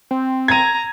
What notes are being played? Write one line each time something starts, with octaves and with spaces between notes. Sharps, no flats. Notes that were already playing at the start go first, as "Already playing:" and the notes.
C4
A#5 G#6 D#7